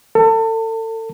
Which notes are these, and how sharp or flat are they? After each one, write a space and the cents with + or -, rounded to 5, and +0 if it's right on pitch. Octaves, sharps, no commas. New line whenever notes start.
A4 +30